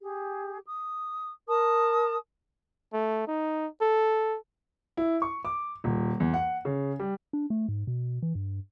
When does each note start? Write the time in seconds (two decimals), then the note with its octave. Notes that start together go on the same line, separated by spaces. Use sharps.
0.01 G4 G#4
0.66 D#6
1.48 A#4 A5 D#6
2.93 A3
3.28 D#4
3.82 A4
4.97 E4
5.22 C#6
5.45 D6
5.84 D#1
6.20 E2
6.34 F#5
6.65 C#3
7.00 G3
7.33 D4
7.50 A3
7.68 G#2
7.87 B2
8.22 E3
8.35 G2